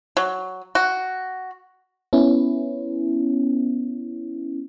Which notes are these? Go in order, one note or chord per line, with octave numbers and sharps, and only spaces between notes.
F#3
F#4
B3 C#4 E4